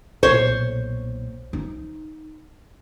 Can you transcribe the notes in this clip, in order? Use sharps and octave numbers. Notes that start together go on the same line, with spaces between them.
B1 A#2 C5 C#5
D#4